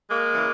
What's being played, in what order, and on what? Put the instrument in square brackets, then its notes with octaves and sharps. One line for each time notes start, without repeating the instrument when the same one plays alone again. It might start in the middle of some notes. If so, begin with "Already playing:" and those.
[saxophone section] G#3 A#3
C#3 E3